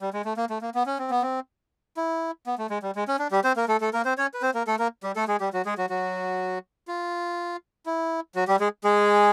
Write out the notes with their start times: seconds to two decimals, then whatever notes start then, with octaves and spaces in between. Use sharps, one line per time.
0.01 G3
0.13 G#3
0.25 A3
0.37 A#3
0.50 A3
0.61 A#3
0.75 B3
0.86 C#4
0.98 C4
1.10 B3
1.22 C4
1.97 E4
2.47 B3
2.58 A3
2.70 G#3
2.83 G3
2.95 G#3
3.08 C#4
3.19 D4
3.31 G3 G4
3.44 C4 C5
3.56 A#3 A#4
3.68 A3 A4
3.81 A3 A4
3.93 A#3 A#4
4.05 C4 C5
4.18 C#4 C#5
4.34 B4
4.42 C4 C5
4.54 A#3 A#4
4.67 A3 A4
4.79 A#3 A#4
5.03 G3 G4
5.16 A3 A4
5.28 G#3 G#4
5.40 G3 G4
5.53 F#3 F#4
5.65 G#3 G#4
5.78 F#3 F#4
5.90 F#3 F#4
6.88 F4
7.86 E4
8.35 F#3 F#4
8.47 G3 G4
8.60 G#3 G#4
8.84 G#3 G#4